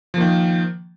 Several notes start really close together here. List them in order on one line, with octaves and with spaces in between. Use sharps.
F3 A#3 D#3